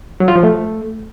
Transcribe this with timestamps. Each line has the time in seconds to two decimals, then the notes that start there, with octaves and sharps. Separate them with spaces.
0.20 F#3
0.28 F4
0.36 F3
0.43 A3